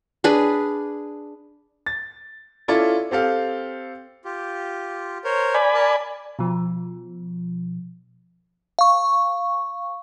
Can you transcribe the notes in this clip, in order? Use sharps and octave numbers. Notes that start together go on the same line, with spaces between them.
D4 G#4 B4
A6
C#4 E4 F4 A4 D5
C4 G4 A4 F5
F4 G4
A#4 C5 C#5
D5 G#5 B5
A#4 A5
B2 F3
F5 C#6